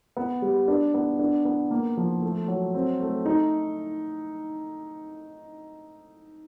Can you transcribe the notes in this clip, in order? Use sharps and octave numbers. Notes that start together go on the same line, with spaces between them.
B3
G3
D4
B3
D4
B3
A#3
F3
A3
F#3
C4
A3
D#4